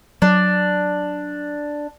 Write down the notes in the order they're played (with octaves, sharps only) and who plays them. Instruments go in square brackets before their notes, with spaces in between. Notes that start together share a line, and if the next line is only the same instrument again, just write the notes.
[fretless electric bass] F#3 [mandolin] D4